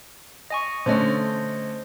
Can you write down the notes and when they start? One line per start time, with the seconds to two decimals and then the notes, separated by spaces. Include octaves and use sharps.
0.50 D#5 G#5 C#6
0.86 D3 A3 C#4 C5 D#5